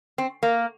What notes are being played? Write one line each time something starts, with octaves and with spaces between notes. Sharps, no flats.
C4
A#3